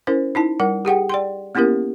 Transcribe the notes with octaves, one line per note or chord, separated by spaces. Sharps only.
C#4 E4 A#4 C5
D#4 E4 A5
G3 A#4 F#5
G4 G#4 F#5 G5
D5 G5 C6
A#3 B3 C#4 E4 G4 A#4